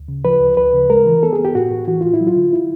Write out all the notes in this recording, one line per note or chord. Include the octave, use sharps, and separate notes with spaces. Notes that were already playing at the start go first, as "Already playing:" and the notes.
Already playing: D2
C#3
F3 B4
D2
D2 B4
C#3
G#3 A#4
E3
B3 A4
G#4
B3
G4
A2 F#4
A2
E3 F#4
A2 F4
E4
F#3
F4
D3
E4